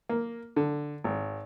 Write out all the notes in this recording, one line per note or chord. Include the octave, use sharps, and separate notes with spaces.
A#3
D3
G#1